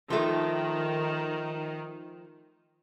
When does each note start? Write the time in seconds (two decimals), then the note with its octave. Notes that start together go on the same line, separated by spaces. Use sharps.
0.10 D#3 F3 A3